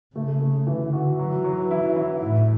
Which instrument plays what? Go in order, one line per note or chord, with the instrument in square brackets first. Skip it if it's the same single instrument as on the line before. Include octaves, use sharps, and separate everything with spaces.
[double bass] C#3 [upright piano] A3
[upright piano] A3
[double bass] D3 [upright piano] E3
[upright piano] F#4
[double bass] E3 [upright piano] F#3
[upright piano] F#3
E4
E4
[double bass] A2 [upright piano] E4